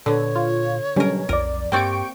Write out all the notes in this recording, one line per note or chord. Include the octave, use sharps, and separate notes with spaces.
A#2 D3 B3 A4 C#5
F4
B2 D3 F#3 G3 C#4 A#4
B1 F2 A#4 D5
G2 A#3 C4 G4 D5 G5 C#6 D7